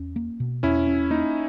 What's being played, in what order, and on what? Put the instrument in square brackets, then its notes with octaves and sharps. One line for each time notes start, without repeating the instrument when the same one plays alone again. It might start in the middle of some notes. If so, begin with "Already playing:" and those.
Already playing: [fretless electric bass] E2 C#4
A#3
B2
[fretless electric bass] E2 [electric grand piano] C#4 E4
[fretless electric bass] C#4
[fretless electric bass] A#3 [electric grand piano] D#4